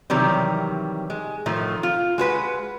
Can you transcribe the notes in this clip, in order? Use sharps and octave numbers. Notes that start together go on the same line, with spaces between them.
C3 D#3 E3 F#3 G3
G#3
A2 D#3 F3 A3
F4
G#3 F#4 B4 F#5